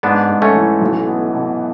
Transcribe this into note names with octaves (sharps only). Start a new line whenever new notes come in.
G#2 B3 D4
G#2
A3 C#4
E3
B1
B3
B2